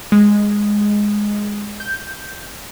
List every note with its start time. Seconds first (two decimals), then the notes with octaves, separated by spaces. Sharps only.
0.12 G#3
1.80 G6